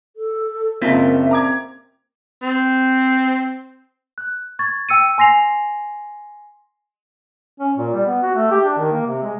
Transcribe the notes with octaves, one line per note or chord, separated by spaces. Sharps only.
A4
F#1 A#3 C4 F4 E5 B6
A#5 D6 G#6
C4
F#6
C#6 G#6 A6
G5 E6 C#7 D#7
G#5 C6 A#6 C7 F7
C#4
A#2
G3
B3
F#4
A3
G4
D4
D#3
A#3
C3
G#3